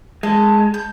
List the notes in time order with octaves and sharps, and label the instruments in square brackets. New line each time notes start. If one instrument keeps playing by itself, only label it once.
[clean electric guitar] G#3 [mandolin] A4
[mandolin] G6